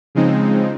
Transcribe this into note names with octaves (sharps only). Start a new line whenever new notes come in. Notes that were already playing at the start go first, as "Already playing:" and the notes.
C#3 F3 G#3 C4 D#4